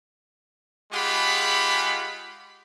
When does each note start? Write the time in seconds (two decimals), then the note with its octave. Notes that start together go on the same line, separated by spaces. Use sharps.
0.93 G#3 F4 G4 G#4 F#5 B5